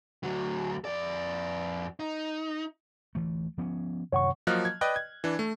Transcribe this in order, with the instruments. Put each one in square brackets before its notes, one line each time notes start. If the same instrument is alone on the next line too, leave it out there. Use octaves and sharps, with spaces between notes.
[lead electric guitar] D2 F#3
F2 D5
D#4
[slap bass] D2 E3 A3
F3 B3 C#4
[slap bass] F#2 C3 D#3 [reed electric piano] C#5 F#5 C#6
[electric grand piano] F3 F#3 A#3 D#5 F6 F#6
G#6
B4 D5 D#5 G5 F#6
G#6
E3 D4
A3